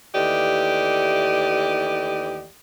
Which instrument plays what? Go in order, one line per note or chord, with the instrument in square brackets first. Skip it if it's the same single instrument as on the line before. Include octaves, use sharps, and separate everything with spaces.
[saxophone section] D#2 E3 A3 G4 D5 D#5